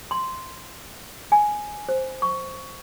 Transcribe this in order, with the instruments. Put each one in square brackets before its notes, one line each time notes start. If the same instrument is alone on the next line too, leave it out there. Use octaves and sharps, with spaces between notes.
[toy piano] C6
G#5
C5
C#6